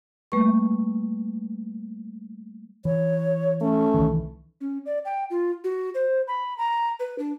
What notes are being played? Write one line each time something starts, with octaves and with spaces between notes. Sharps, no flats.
G3 A3 A#3 B4 C#6
E3 C#5
A3 C#4
C2 D#3 E3
C#4
D5
G5
F4
F#4
C5
B5
A#5
B4
D4